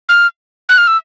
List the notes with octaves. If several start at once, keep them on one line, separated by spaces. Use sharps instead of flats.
F6
F#6
F6
E6